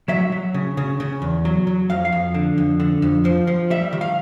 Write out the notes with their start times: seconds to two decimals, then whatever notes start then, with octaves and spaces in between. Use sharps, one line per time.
0.08 F#3 E5
0.32 F#3
0.54 C#3
0.77 C#3
1.00 C#3
1.22 E2
1.45 F#3
1.67 F#3
1.90 F2 F5
2.05 F5
2.12 F2
2.34 D3
2.58 F2
2.80 D3
3.02 F2
3.25 F3
3.47 F3
3.70 G3 E5
3.93 D#3
4.01 F5